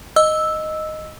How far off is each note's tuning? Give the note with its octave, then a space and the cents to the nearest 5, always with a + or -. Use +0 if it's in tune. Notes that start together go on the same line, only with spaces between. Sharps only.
D#5 +0 E6 -5